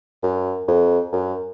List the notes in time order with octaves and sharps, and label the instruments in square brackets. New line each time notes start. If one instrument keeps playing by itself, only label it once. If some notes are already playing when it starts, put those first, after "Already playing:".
[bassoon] F#2
F2
F#2